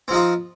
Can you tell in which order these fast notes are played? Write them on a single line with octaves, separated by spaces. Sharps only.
C4 F3 D#4 F4